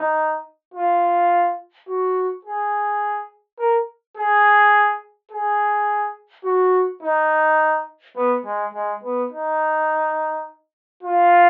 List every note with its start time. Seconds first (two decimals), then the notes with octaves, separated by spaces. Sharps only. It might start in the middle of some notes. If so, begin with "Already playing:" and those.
Already playing: D#4
0.74 F4
1.88 F#4
2.45 G#4
3.59 A#4
4.17 G#4
5.32 G#4
6.45 F#4
7.03 D#4
8.16 B3
8.45 G#3
8.73 G#3
9.03 B3
9.32 D#4
11.03 F4